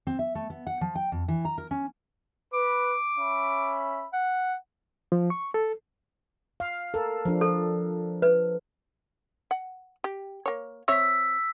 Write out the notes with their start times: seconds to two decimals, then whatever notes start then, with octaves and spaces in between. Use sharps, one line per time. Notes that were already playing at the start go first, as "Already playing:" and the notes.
0.07 C4
0.19 E5
0.35 A3
0.50 B3
0.67 F#5
0.81 F3
0.95 G5
1.12 F2
1.28 E3
1.45 A#5
1.58 A#4
1.71 C#4
2.53 B4 D6
3.19 C#4 E5 B5
4.13 F#5
5.12 F3
5.30 C#6
5.54 A4
6.60 F5
6.94 A4 A#4
7.25 F3 D4
7.41 A4
8.22 B4
9.51 F#5
10.04 G4
10.46 A#3 C#5
10.88 C4 C#5 E5 E6 B6